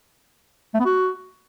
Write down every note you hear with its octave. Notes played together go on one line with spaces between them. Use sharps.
A3
B3
F#4